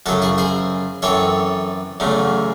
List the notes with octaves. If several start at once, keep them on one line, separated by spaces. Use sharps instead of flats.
F#2 C#3 F#3 F#4 A4
E4 G#4
G#4 C5
F#2 E3 C4 A4 C#5
E2 C#3 F#3 A3